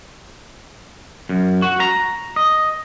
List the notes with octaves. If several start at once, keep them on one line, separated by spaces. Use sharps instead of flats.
F#2
F#4
A#5
D#5